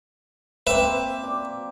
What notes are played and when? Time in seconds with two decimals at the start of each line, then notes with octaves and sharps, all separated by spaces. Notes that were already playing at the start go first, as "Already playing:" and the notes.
0.67 A#3 C4 B4 E5
1.23 D5 D6